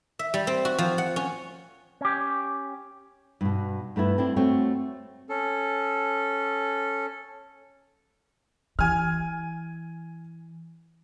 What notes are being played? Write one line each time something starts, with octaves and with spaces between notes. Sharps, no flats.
E5
G3
C4
F#4
F3
F#5
C#4
C#4 G4
G2 B2
G2 A3 B3 E4
C4 D4 E4
A3 C4 F#4 C#5
C#4 A4
E3 G#5 F6